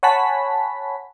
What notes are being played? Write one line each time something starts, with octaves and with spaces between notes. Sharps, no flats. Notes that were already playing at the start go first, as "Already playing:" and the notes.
C#5 F#5 G#5 A5 B5 B6